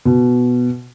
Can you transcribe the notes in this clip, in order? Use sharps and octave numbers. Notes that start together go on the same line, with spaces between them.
B2